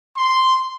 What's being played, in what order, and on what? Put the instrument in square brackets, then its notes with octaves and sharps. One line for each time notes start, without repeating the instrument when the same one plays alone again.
[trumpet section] C6